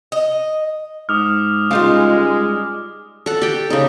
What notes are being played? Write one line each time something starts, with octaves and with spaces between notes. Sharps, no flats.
D#5
G#2 D6 D#6 F6
C#2 G3 G#3 D#4 F4
A4 F#5
G4 G5
C#3 D#4